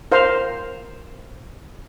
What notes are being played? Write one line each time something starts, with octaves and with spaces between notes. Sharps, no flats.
A#4 C5 F5